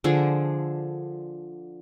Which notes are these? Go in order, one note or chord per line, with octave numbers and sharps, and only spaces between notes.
D3 F3 G#4